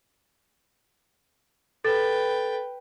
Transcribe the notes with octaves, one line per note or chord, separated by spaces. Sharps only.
A4 B4 G5 A6